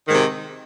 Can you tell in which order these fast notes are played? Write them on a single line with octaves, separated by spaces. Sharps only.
D#3 G#2 C3